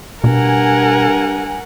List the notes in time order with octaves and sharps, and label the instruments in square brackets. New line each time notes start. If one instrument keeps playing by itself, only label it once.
[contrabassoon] G2 [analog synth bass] B2 [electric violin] A#4 F#5 [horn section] G#5